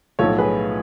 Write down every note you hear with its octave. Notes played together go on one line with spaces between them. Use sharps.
B1 A2 F3 A4 C#5
G#4 B4